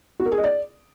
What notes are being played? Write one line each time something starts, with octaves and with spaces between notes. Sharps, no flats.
F#4
A#4
G#4
D#5
D5